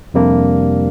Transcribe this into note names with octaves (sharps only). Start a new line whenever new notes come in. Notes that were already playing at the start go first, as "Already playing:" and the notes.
F2 C3 G3 A#3 D4